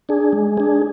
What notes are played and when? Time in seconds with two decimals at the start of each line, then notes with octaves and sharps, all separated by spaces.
0.09 D4 G#4
0.33 G#3
0.58 D4 G#4